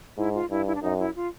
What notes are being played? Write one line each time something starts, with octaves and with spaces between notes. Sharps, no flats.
G#2 E4
F4
G2 E4
E4
D4
F#2 D#4
E4
F4